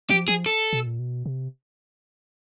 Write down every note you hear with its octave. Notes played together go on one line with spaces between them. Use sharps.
F3 G4
F3 G#4
A4
B2
A#2
B2
C3